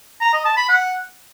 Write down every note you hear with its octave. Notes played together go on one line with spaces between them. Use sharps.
A#5
D#5
A5
B5
F#5